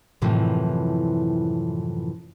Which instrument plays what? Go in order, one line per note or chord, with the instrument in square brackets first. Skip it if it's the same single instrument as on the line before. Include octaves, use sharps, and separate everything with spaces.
[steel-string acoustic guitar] F#2 A2 C3 E3 F3